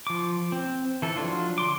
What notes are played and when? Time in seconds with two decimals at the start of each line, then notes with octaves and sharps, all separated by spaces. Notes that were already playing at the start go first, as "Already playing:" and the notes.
0.07 F3 D6
0.52 C4
1.02 E3 A4
1.16 F3 F#3 D4 F4
1.58 D3 C6 D6